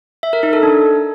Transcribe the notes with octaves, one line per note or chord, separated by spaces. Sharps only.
E5
A#4
D#4
A4
D4